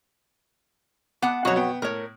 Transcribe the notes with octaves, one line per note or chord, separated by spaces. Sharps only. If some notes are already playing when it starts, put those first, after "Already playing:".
B3 F#5 A5 D6
F2 B2 F#3 F#4 C#5
B3 G5
A2 A#4 C#5